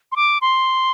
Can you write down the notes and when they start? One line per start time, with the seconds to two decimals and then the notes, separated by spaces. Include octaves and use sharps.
0.12 C6
0.16 D6
0.42 C6